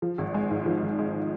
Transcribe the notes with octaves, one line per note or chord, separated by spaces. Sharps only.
F3
G#1
G#3
G#2
F3
G#1
G#3